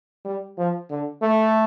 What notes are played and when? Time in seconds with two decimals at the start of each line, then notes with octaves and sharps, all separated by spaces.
0.25 G3
0.58 F3
0.90 D3
1.22 A3